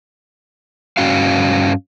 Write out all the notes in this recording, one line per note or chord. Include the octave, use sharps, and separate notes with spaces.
G2 C#4 F#4 F5